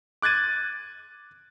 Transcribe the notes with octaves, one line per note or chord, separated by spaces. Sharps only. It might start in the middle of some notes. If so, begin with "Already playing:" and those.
D6 F#6 G#6 A6 D#7